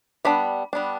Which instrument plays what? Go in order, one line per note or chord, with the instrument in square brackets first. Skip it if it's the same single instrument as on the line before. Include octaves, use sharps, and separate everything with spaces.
[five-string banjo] G3 B3 D4 B5
G3 B3 D4